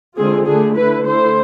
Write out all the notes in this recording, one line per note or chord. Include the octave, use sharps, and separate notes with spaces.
D3 G#3 C4 F4 G#4
D3 A3 D4 G#4
D3 A3 E4 B4
D3 A3 E4 C5